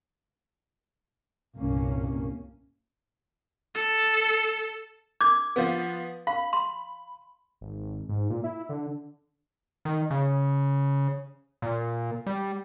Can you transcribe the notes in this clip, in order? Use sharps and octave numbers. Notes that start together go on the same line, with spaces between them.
C2 G2 A#2 A#3 C#4
A4
D6 G#6
F3 B3
F5 B5
C6
G#1
G#2
A#2
E4
D3
D#3
C#3
A#2
G3